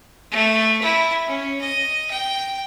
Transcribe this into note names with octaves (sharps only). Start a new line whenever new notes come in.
A3
E4
C#4
D#5
G5